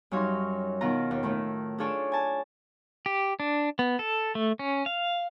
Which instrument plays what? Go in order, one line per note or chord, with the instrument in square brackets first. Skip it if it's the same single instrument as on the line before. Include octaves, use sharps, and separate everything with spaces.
[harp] F#2 G3 D#4 C#5 F5 C6
B2 D#3 F4 A#5
D#2
A2 D#3 A3
D4 F4 G#4 A4 C#5 D5
G#5 A5
[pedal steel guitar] G4
D4
B3
A4
A3
C#4
F5